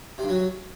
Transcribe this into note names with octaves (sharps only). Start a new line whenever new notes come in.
C3
G2
F#3